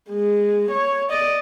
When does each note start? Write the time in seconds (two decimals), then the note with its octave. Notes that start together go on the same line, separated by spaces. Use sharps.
0.11 G#3
0.71 C#5
1.10 D5 D#5